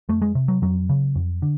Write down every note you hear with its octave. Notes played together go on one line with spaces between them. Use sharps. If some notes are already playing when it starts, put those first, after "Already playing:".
F2 A3
G#3
C3
F#3
F2 F#3
C#3
F2
D3